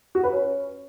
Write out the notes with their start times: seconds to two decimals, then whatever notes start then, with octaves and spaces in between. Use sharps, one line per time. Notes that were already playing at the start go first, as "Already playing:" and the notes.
0.15 F#4
0.24 B4
0.32 C#4